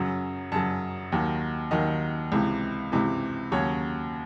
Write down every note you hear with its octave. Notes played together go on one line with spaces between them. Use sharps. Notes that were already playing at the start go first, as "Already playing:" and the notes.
Already playing: F#2 C#3 F#3
F#2 C#3 F#3 A5
D#2 D#3 F#3
D#2 D#3 F#3 D#5
C#2 C3 E3
C#2 C3 E3
D#2 C#3 F#3 C#5